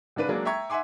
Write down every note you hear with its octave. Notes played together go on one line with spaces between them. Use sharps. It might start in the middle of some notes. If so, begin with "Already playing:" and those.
G#2 C#3 D4 B4 D#7
F#3 G#3 A#3 D4
E5 G5 A#5 C#6 G#6
E5 F#5 G#5 C6 D6